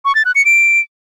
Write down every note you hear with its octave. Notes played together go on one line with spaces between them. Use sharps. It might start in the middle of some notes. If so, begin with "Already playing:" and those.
C#6
A6
F#6
C#7
D7